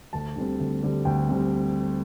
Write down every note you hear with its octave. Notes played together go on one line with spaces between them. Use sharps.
D2 A5
D3 G3 C4
D2
D3 G3 C4
D2 G5
D3 G3 C4